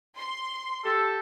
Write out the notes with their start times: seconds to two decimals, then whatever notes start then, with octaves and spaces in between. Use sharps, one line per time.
0.16 C6
0.83 G4 A4